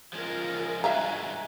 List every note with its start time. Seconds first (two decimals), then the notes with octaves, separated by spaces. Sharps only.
0.13 F3 G#3 C#4 F4 A#4
0.84 G2 G#3 F#4 E5 F5 G#5 A#5